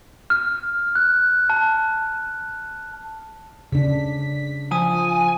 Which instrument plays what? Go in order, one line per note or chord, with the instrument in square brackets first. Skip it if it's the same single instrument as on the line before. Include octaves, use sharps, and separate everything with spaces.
[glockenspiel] F6
F#6
A5
[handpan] C#3 D4 [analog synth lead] B6
[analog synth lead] F3 [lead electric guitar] G#5 [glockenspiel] D#6